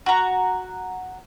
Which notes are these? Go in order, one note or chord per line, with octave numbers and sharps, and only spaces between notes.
F#4 A#5